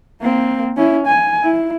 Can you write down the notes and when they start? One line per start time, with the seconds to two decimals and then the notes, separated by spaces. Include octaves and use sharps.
0.21 A#3 C4
0.77 C#4 E4
1.07 G#5
1.44 E4